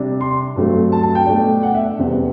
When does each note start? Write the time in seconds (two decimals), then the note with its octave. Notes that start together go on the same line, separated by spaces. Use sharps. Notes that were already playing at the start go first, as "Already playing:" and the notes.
Already playing: C3 G3 D4
0.21 C6
0.56 G2 F#3 A3 C4
0.92 A5
1.03 A5
1.15 G5
1.27 B2 A3 D4
1.63 F#5
1.75 E5
1.99 E2 C3 G3 C4